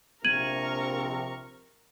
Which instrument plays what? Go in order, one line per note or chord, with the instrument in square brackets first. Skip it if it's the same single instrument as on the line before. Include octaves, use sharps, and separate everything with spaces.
[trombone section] A#1 C3 [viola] A#4 C#6 [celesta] G#6 D#7 F#7